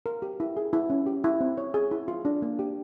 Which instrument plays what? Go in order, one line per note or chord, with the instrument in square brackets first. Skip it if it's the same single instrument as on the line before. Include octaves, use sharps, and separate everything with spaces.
[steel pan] A#4
G4
E4
G#4
E4
C#4
G4
E4
C4
C#5
G#4
E4
F4
D4
A#3
G4